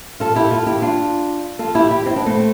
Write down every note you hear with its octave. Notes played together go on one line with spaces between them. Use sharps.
F4 A4
E4 G4
F4 A4
E4 G4
D4 F4
F4 A4
E4 G4
E4 G4
C4 E4
B3 D4
A3 C4